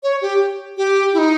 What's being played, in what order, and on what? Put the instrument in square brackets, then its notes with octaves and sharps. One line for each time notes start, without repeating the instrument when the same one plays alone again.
[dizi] C#5
G4
G4
E4
D#4